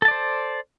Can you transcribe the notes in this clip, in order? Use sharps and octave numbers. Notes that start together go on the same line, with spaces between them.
A4 C5 D5 A5